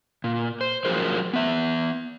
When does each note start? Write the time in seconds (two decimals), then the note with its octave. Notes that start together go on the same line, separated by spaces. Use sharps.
0.24 A#2
0.61 C5
0.85 F3 F#3 G#4 A#4 C5
1.33 B3 E5